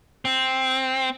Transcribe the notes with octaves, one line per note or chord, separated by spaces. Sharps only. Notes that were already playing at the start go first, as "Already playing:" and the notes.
C4